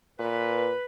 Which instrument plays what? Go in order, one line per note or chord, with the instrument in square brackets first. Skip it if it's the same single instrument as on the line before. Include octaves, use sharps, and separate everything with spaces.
[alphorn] A#2 [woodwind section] B4